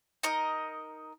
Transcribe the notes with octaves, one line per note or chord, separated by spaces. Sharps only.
D#4 A#4 D#5